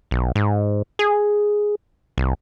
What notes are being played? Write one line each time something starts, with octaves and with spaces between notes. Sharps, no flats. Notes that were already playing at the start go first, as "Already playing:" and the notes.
B1
G#2
G#4
C2